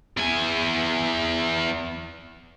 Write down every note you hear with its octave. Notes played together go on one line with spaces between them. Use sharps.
E2 G#5